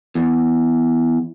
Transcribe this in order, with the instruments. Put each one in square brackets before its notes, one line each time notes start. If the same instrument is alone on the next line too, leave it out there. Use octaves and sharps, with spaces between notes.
[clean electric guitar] E2